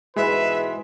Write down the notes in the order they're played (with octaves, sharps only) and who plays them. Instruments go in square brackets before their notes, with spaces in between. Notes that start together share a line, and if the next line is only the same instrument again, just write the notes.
[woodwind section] G#2 B2 E3 [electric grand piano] G#3 [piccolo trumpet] B4 [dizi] E5